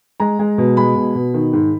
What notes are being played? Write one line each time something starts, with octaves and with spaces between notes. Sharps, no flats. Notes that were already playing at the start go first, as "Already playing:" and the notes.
G#3 A#5
G#3
B2
G#3 B5
B2
B2
D#3
G#2